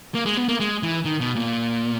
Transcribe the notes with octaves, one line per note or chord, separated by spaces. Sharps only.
A#3
G#3
B3
A#3
G#3
E3
D#3
B2
A#2